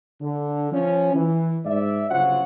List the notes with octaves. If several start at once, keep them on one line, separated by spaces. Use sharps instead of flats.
D3
F3 C#4
E3
G#2 D5 E5
G1 C#3 F#3 F4 C5 F#5